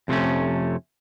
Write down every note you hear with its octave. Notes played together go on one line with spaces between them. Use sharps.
F2 C3 G#3 A3 C#4